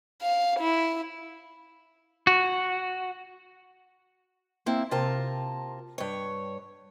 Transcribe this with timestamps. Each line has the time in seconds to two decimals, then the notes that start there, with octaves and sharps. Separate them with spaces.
0.22 F5
0.59 E4
2.27 F#4
4.66 A#3 C4 E4
4.91 C3 F4 A#4 A5
5.98 G2 C#5